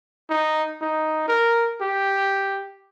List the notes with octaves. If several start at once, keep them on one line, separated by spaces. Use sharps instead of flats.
D#4
D#4
A#4
G4